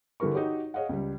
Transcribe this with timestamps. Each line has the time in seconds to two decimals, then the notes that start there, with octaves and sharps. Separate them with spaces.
0.20 D3 E3 G3 A#4 C#6
0.34 D#4 F#4 G4 C#5
0.74 G#4 C#5 D#5 F5 F#5
0.89 C#2 G3